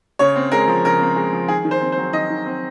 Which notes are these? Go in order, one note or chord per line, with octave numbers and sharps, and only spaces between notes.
C#3 C#5
C4
G#3 A#4
F3
C#3 A#4
C4
G#3
F3
D#3 G#4
D#3
C5
C4
C5
F#3
D#3 D#5
D#3
C4